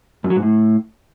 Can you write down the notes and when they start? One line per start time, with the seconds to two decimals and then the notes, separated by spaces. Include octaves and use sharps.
0.24 F#2
0.30 F#3
0.36 G#2
0.42 A2